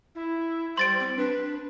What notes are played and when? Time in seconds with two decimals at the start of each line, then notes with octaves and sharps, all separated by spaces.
0.15 E4
0.77 G3 C5 C6 A6 D7
1.00 C4
1.17 D4 B4